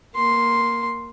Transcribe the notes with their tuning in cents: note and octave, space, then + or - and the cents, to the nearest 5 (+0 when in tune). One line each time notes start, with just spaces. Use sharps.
A#3 +0 C6 +0